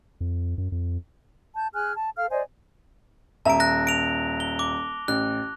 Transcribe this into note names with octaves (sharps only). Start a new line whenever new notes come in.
F2
F#2
F2
A5 G6
G#4 G#5 F6 F#6
A5
A4 F5 F6
C5 D5 D#5 G#5
D#1 E5 A5 A#5 D7
F#6 A#6
D7 F7
G7
D6
A1 F#6